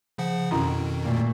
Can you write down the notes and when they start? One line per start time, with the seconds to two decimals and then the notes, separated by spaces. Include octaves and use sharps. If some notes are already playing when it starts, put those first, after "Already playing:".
0.18 C#3 F3 F#5
0.51 F2 B2 D#3 C#4 E4 A#5
1.05 A#2 A3